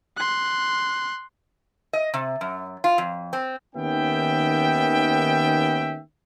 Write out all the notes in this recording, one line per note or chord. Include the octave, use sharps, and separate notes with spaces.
C6 F#6
D#5
C3
F#2
F4
F2
C4
D#2 D#3 B3 C#4 E5 G5